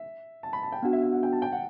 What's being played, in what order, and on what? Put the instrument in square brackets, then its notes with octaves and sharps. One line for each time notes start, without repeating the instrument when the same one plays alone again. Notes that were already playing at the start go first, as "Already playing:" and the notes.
Already playing: [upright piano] E5
A5
B5
A5
G5
[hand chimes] B3 D4 F#4 [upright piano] F#5
[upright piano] E5
E5
F#5
G5
A5
G5
F#5